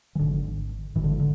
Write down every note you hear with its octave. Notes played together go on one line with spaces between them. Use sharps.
E3
G#1 G#2 D3
G#1 G#2 E3
D3
D3